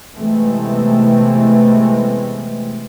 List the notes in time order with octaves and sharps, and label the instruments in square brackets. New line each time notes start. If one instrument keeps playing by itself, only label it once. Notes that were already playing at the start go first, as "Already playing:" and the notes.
[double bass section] C3 E3 G#3 A3 B3 C4